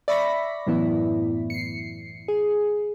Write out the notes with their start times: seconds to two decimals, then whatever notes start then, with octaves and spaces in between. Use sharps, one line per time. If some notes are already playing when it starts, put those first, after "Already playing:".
0.08 D5 E5 B5 C#6 A#6 B6
0.66 F#2 A2 E3 B3 E4
1.50 C7 C#7
2.28 G#4